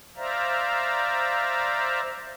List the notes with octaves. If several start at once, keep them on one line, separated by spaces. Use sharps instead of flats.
C5 D5 E5 F5 A#5